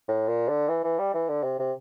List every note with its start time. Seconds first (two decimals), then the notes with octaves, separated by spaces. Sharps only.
0.08 A2
0.28 A#2
0.49 D3
0.69 E3
0.84 E3
0.99 G3
1.14 E3
1.29 D3
1.44 C3
1.59 C3